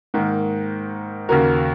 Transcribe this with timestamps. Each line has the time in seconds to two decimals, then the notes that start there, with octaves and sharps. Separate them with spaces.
0.14 G#2 D#3 A#3
1.29 D#2 C#3 A#3 F#4 A#4